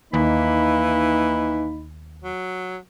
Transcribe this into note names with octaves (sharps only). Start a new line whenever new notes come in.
D#2 E3 A#3 D#4 B5
F#3